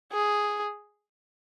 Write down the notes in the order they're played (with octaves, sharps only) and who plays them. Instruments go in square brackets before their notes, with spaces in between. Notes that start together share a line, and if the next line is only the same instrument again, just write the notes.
[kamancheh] G#4